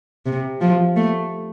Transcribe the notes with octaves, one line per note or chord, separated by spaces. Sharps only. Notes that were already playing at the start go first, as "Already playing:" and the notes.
C3
F3
A3